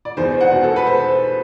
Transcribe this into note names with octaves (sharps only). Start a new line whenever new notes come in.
D5
E2 C5
F#5
B2
A4
B4
C5